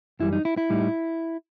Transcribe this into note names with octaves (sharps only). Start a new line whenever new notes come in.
F#2 E3 G3 E4
D#4
E4
E4
A2 G3 D#4